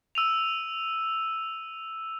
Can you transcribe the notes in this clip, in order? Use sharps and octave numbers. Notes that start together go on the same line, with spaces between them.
E6 D#7 F7